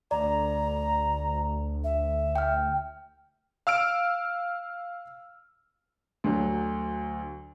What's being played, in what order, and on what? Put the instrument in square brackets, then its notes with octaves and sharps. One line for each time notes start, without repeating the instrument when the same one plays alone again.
[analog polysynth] D2 [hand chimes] D5 [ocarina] A#5
[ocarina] E5
[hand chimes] G5 F6
[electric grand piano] F5 E6 F6 D7
[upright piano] D2 D3 F#3